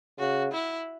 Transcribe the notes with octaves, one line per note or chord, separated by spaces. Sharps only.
C#3 F#4
E4